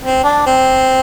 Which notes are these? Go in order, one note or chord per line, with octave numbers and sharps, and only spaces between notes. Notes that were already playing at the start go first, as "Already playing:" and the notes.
C4
D4
C4